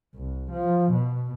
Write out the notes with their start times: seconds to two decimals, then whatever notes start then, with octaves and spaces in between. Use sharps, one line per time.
0.15 C2
0.52 F3
0.93 B2